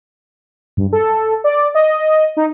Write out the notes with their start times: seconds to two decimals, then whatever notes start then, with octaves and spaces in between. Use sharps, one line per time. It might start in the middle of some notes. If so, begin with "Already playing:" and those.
0.77 G2
0.93 A4
1.44 D5
1.75 D#5
2.37 D#4